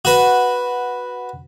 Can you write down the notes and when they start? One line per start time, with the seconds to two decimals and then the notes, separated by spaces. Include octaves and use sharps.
0.05 F#4 B4